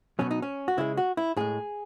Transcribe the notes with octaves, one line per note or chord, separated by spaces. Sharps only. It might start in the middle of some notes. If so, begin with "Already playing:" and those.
B2 F#3 C#4
D#4
C#4
F#4
C#3 G#3 E4
F#4
E4
A2 G#3 G#4